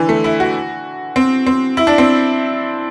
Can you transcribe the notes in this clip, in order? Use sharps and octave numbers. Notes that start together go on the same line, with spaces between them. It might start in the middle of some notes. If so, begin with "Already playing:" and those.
Already playing: D3 E3
A3
E4
F#4
C4
C4
E4
D4
C4